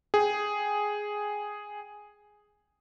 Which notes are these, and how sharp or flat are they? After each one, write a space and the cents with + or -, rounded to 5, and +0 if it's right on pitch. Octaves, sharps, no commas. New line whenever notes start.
G#4 +0 G5 +0